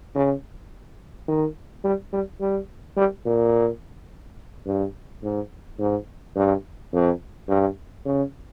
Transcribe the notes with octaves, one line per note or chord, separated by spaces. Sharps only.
C#3
D#3
G3
G3
G3
G3
A#2
G2
G#2
G#2
G2
F2
G2
C#3